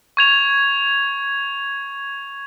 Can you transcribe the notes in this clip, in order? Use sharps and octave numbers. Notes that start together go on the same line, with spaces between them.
C#6 G#6 F7